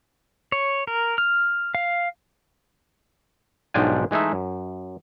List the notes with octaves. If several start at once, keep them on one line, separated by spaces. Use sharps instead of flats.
C#5
A#4
F6
F5
B1 G#2 F3 D4 G5 G#5
E3 G#3 A3 D#4 E5
F#2